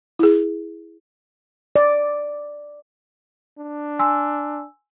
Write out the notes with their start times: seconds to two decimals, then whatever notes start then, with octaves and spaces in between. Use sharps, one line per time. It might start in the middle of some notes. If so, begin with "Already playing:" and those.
0.19 E4 G#4
1.76 D5
3.59 D4
3.99 G#5 C6 E6